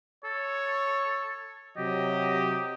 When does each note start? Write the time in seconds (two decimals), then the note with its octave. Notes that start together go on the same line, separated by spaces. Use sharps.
0.24 A4 C#5
1.77 C3 F#3 G4 D#5